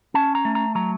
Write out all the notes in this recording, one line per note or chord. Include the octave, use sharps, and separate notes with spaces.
C#4 A5
A#5
A3
A#5
F#3 A#5